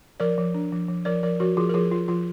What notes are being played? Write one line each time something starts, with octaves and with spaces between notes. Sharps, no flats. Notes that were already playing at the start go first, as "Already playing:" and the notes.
F3 A#4 D5
F3
D4
F3
F3
F3 A#4 D5
F3 A#4 D5
F3 F#4 A#4
F3 F4 G#4
A#4
F3 F4 G#4
F3 F4
F3 F4